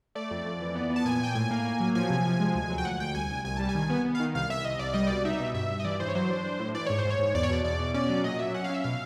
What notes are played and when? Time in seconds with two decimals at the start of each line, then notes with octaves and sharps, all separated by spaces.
0.15 A3 D5
0.31 F2
0.45 F2
0.60 E3
0.75 B3
0.90 B3
0.96 A5
1.05 A#2 G#5
1.20 A#2 G5
1.35 A2 G#5
1.51 A#3
1.65 A#3
1.80 F#3
1.95 F3 G#5
2.10 C3
2.25 F3
2.40 G#3
2.55 D2
2.70 F#3
2.78 G5
2.85 D2 F#5
3.00 D2 G5
3.15 C2 G#5
3.30 C2
3.45 C2 G#5
3.57 G3 A5
3.69 G#5
3.75 D#3
3.90 B3
4.05 B3
4.15 F5
4.20 D#3
4.35 C2 F5
4.50 C2 E5
4.64 C2 D#5
4.79 C2 D5
4.94 G3 D#5
5.07 B2 D5
5.25 D#4 E5
5.40 B2
5.54 G2 E5
5.70 G2
5.80 D#5
5.85 E3 D5
6.00 E3 C5
6.09 C#5
6.15 F#3 C5
6.30 D4
6.44 D4
6.60 A2
6.74 E3 D5
6.86 G#2 C#5
6.99 C5
7.05 G#2
7.10 C#5
7.19 G#2
7.35 E2 D5
7.43 C#5
7.50 B2 D5
7.64 E2 D5
7.79 B2
7.94 C#4 D5
8.09 F#3
8.24 A#2 D#5
8.39 F#3 E5
8.54 C#4 F#5
8.64 F5
8.70 C#4 E5
8.84 B2 F5